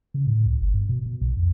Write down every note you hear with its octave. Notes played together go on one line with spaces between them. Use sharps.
C#3
A2
C#2
G1
G2
B2
B2
B1
F2